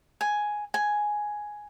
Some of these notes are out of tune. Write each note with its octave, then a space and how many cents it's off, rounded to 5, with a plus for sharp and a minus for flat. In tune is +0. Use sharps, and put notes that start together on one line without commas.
G#5 +5
G#5 +5